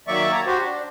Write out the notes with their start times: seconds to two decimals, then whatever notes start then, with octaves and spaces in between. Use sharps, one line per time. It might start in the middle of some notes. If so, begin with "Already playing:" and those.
0.08 D#3 F#3 A#3 D5 E5 C#6
0.32 C#5 A5 A#5
0.46 F#4 G4 C5
0.60 D4